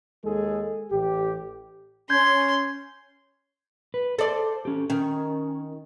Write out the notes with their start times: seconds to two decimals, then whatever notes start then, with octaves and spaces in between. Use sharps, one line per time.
0.24 D#2 G#3 G#4 A4
0.92 A1 G4
2.10 C#4 C6 G6 G#6
3.94 B4
4.19 A4 C5 D5
4.65 C#4 G4
4.90 D#3 C#4